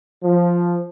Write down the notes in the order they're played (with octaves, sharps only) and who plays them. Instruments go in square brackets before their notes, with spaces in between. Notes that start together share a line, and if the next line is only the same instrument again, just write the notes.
[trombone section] F3